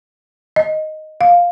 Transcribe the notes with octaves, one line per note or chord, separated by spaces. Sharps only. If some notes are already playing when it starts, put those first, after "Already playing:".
D#5
F5